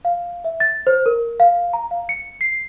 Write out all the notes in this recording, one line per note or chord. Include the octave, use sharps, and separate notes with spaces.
F5
E5
A6
C5
A#4
F5
A#5
F5
C#7
C7